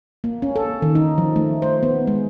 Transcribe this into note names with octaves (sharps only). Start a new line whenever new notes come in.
A#3
C#4
A4
D#3
D#4
F3
A3
C5
B3
G#3